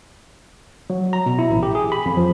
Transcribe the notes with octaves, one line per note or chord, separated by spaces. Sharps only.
F#3
A#5
B2
E4
A1
G4
G#4
B5
F2
F3